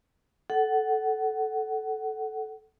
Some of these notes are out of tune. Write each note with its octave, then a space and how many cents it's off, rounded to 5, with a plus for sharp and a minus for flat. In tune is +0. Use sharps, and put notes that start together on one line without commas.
A4 -10 F#5 +20